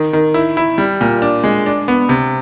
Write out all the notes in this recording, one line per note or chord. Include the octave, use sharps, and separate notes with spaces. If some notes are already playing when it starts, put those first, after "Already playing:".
Already playing: D#3
D#3
E4
E4
G3
A#2
D4
G#3
D4
B3
C3